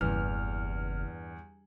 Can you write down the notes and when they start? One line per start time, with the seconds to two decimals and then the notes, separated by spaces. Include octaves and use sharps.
0.01 F#1 E2 G2 C#3 E3 F6